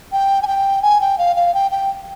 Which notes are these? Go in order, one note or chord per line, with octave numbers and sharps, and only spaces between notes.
G5
G#5
G5
G#5
G5
F5
F5
G5
G5